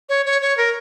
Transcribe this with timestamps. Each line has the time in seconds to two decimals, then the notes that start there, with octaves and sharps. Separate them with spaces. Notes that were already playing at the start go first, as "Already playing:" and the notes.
0.09 C#5
0.26 C#5
0.42 C#5
0.57 A#4